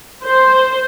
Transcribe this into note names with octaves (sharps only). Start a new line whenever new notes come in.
C5